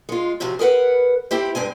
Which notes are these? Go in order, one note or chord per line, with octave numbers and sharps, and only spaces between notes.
G#3 F4
A2 C3 F3 C4 F#4
G#4 A#4 B4 F#5
C4 E4 G4 C5
G2 G#3 C4 G#5